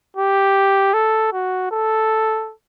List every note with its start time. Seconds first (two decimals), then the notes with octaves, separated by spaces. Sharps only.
0.16 G4
0.94 A4
1.33 F#4
1.71 A4